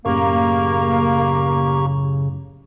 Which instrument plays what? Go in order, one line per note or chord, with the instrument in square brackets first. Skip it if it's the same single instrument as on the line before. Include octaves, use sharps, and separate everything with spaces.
[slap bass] F#2 A2 [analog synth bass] C#3 [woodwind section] A#3 [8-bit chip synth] G4 A#5 C#6